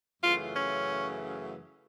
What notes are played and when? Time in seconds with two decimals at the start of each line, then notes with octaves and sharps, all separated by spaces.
0.22 F#2 C#3 E3 A3 F4
0.56 C#4